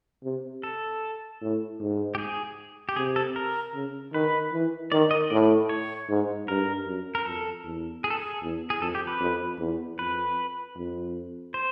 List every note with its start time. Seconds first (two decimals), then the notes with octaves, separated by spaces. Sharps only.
0.24 C3
0.63 A4
1.42 A2
1.80 G#2
2.15 G4
2.18 G#4
2.89 G4
2.96 C3 G#4
3.16 A4
3.36 A#4
3.74 C#3
4.13 D#3 B4
4.53 E3
4.92 D#3 D5
5.11 D#5
5.30 A2 D5
5.69 C#5
6.09 G#2
6.48 G2 A#4
6.87 F#2
7.15 A#4
7.26 F2 A4
7.64 E2
8.04 G#4
8.10 A4
8.19 G#4
8.42 E2
8.70 G#4
8.81 F2 A4
8.95 G4
9.07 B4
9.20 F2
9.59 E2
9.98 F2 B4
10.76 F2
11.54 C5